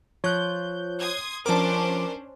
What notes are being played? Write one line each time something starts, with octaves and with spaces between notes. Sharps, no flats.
F3 C#5 F#6 G6
C6 D#6 G#6
F3 C#4 D4 A#4 C5 A5 D6